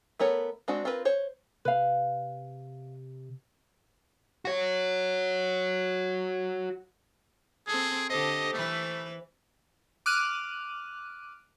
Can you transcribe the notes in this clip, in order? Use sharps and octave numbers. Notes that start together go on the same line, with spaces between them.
A3 B3 A#4 C#5
G#3 C4 D4 F#4
C4 F4 A#4 B4
C5 C#5
C3 B4 F5
F#4 C#5
C4 G#4 A4
D3 G4 A4 C5 D#5
E3 A3 B4
D6 F6 F#6 D#7